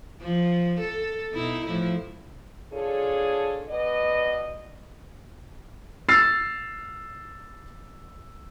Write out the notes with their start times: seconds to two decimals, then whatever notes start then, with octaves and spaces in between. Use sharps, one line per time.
0.22 F3
0.81 A4
1.33 B2 D#4 E4
1.65 A2 F3 E4
2.73 D4 F4 G#4 A4 C#5
3.69 B2 B3 D5 D#5
6.09 E6 F6 A6 C7